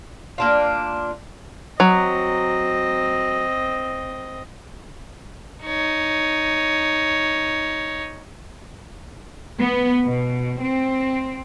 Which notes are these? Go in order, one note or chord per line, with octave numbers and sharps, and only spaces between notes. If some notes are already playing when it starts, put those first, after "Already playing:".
A#3 D4 F4
F#3 C4 D#5
D#4 C#5
B3
B2
C4